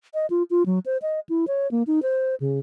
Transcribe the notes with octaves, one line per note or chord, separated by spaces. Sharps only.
D#5
F4
F4
F#3
C5
D#5
E4
C#5
A#3
D#4
C5
C#3